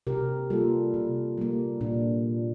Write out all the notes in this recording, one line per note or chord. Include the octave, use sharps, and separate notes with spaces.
C3 G4 A#4
G3 A#3 F4 A4
C3
G3 A#3
A#2 D4